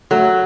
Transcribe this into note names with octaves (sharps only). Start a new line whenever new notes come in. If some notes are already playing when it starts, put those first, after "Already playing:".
F#3 A3